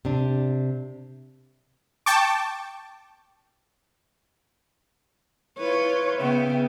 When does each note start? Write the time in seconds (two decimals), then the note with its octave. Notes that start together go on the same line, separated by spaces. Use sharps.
0.05 C3 D4
2.06 G5 A5 C#6 D6
5.58 E4 F4 B4 C#5
6.19 C#3 B3 E5 G5